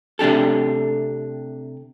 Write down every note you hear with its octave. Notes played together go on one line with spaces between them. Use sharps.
C3 A3 D4 G4 A4